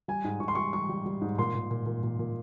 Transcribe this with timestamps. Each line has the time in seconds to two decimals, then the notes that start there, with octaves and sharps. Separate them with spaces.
0.08 G3 G#5
0.24 G#2
0.40 G#2 C#6
0.48 C6
0.55 G3 C#6
0.73 G3 C#6
0.89 G3
1.06 G3
1.21 G#2
1.38 A#2 C6
1.55 A#2
1.71 A#2
1.86 A#2
2.03 A#2
2.19 A#2